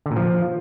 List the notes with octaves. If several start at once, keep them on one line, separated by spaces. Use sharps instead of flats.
D3
A#2
F3